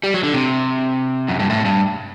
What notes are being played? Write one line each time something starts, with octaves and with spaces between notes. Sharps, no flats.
G3
F#3
D3
C3
F#2
G2
A2
G2